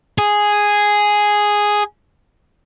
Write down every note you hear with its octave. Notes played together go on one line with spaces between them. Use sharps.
G#4